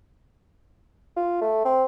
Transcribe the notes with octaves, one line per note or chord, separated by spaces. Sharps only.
F4
A3
C4